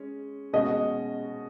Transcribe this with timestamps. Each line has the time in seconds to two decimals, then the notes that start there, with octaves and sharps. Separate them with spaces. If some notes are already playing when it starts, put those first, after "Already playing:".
Already playing: G#3 C#4
0.53 B2 G#3 C#4 F#4 D#5